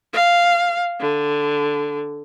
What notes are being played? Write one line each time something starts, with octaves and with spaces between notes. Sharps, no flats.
F5
D3